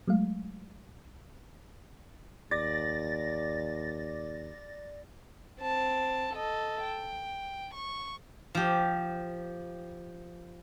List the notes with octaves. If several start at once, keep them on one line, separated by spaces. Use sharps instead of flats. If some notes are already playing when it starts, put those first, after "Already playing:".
F#3 G#3 A3 F5
D#2 D5 A6 A#6
C4 A5
A4 D#5
G5
C#6
F3 G4